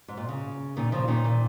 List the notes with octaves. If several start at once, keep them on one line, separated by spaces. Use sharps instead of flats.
G#2
A#2
C#3
A#2 D#3
C#3 F3
A#2 D#3
A#2